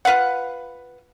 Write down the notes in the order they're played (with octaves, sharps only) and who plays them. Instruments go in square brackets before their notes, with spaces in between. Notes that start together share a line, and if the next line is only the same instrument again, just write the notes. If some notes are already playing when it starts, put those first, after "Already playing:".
[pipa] F4 B4 F5 F#5